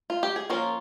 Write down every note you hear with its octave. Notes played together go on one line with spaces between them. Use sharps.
F4
G4
G#4
F3 A#3 C#4 F4 A#4